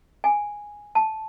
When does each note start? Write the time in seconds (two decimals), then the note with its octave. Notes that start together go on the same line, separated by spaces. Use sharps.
0.24 G#5
0.95 A5